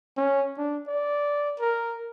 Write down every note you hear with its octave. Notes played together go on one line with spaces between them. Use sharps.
C#4
D4
D5
A#4